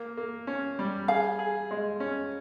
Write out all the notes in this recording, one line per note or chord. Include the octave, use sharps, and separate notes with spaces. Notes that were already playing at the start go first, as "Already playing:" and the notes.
Already playing: A#3
A#3
C#4
G3
G#4 F5
G#4
G#3
C#4